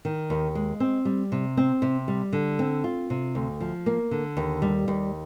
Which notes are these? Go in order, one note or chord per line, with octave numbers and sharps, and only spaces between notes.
D#3
D#2
G#3
C4
G3
C3
C4
C3
G3
D3
C4
F4
C3
D2
F3
A#3
D3
D#2
G3
D#2